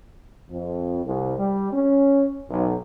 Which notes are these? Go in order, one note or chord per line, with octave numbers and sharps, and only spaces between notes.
F2
C2
G3
C#4
B1